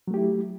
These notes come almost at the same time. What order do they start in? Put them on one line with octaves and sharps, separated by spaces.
F#3 A3 G4 E4